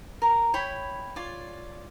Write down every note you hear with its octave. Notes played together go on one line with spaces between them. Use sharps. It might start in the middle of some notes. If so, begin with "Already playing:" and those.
A#4 A#5
E4 C#5 G5 B5
F4 C#5 D5